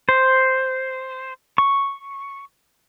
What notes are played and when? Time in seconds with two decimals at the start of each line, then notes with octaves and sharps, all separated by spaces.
0.09 C5
1.58 C#6